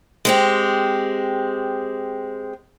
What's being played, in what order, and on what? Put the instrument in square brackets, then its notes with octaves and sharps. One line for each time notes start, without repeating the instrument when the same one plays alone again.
[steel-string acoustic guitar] G#3 C4 G4